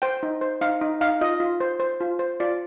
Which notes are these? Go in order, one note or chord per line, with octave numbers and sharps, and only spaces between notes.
C5 G5
D#4
C5
D#4 F5
D#4
D#4 F5
F4 D#5
F4
C5
C5
F4
C5
F4 D5